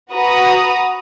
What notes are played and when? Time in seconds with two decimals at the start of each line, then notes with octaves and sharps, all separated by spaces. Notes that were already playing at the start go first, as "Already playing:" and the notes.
0.11 F#4 B4 A#5 D#6